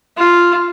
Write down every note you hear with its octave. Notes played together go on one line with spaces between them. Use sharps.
F4